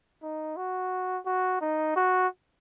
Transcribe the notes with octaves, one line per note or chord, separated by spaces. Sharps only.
D#4
F#4
F#4
D#4
F#4